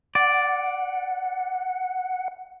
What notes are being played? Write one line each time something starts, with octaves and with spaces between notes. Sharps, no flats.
D5 F#5